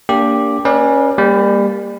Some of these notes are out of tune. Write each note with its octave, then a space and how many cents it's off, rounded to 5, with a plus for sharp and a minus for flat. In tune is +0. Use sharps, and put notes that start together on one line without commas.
A#3 -15 D4 -30 G4 +0
C#4 +0 B4 -35 D5 +25
G3 +30 A#3 +0